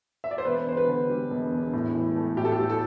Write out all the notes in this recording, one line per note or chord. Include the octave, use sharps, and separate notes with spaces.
E5
D5
C5
E1 B4
E2 C5
B4
D3
G3
E1
E2
A2
E3
A3
A2 G4
A4
G4
A2
A4